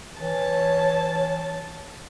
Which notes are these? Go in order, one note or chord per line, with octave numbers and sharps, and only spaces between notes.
E3 C#5 A5